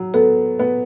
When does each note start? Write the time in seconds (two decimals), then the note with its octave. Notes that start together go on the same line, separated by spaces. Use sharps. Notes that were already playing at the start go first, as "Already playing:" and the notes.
Already playing: F#3
0.14 B3 A4
0.59 B3